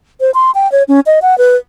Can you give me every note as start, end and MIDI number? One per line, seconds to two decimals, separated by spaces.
0.21 0.31 72
0.34 0.51 84
0.55 0.70 79
0.72 0.83 73
0.88 1.00 61
1.06 1.19 75
1.22 1.37 78
1.38 1.56 71